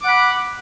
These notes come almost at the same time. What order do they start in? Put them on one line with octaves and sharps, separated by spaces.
D6 F#5 B5